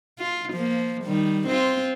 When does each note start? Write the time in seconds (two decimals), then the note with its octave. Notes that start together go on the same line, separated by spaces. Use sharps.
0.19 F4
0.53 F3 A#3
1.04 D#3 G3
1.47 C4 F4